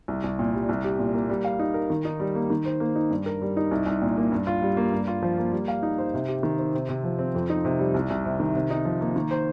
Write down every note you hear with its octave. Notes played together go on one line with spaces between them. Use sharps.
C2
C2
A#2
G3
C2
G4
A#2
A#3
G3
F5
D#4
A#4
D#3
D#4
G3
A#3
D#3
C5
A#3
D#4
G2
A#4
G3
D#4
C2
C2
A#2
A#3
G2
F4
G3
A#3
G2
F4
F3
A#3
G3
F5
D#4
C5
C3
G4
D#3
C4
C3
C3
F3
C4
F2
D#4
C3
G3
C2
C2
C3
D#3
C3
D#4
F3
A#3
D#3
C5